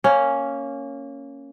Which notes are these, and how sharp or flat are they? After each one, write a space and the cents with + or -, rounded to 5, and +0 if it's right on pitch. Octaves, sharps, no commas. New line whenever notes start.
A#3 -10 C#4 +0